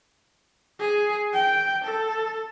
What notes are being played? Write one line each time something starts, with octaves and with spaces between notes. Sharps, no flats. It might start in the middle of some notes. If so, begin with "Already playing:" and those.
G#4
G5
A4